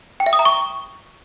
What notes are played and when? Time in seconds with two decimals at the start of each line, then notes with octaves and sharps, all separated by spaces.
0.20 G5
0.26 E5
0.33 D#6
0.39 A#5
0.45 C#6